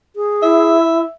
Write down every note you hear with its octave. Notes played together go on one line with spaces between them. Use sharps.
G#4
E4 E5